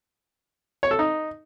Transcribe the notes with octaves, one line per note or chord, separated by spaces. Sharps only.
C#5
A4
D#4